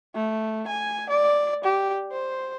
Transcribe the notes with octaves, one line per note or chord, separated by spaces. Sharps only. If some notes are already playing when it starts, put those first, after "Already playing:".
A3
G#5
D5
G4
C5